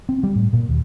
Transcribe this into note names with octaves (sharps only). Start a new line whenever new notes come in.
C4
G3
A2
A#2
D#2